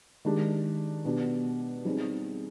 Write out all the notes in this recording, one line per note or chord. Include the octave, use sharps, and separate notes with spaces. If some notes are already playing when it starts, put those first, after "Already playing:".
D#3 G#3 D4 G4
B2 B3 D4 G4
G3 C4 D#4 G#4